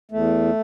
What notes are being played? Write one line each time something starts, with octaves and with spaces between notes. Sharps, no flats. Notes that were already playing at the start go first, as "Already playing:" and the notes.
E2 A3